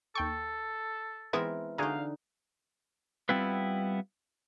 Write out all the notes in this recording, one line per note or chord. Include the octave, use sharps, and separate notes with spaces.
D#2 A4 G5 C#6
E3 G#3 B3 C4 E4 A#4
D3 D#4 F#4 G#4 F5 A#5
G3 B3 C4 E4 F4 B4